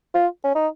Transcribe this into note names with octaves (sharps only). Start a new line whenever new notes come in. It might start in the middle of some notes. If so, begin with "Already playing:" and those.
F4
C#4
D#4